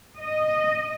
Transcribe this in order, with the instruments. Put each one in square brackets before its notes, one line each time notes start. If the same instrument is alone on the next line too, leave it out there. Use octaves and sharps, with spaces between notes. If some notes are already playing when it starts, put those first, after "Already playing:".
[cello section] D#5